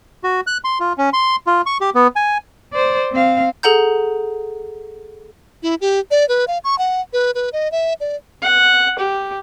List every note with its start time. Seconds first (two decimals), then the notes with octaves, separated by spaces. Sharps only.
0.24 F#4
0.47 F#6
0.64 C6
0.80 F4
0.98 C#4
1.13 C6
1.47 F4
1.66 C#6
1.81 G4
1.95 B3
2.16 G#5
2.73 C5 D5
3.12 C4 F5
3.63 G#4 A4 F#5 A#5 G6
5.63 E4
5.81 G4
6.11 D5
6.29 B4
6.48 F5
6.64 C#6
6.78 F#5
7.13 B4
7.35 B4
7.53 D#5
7.72 E5
8.00 D5
8.42 F#5
8.99 G4